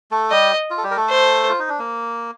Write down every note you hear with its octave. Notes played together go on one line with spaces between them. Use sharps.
A3 A4
G3 G4 D#5
F4
A4
G3 G4
A#4
A3 A4
C5
F4
D#4
D4
A#3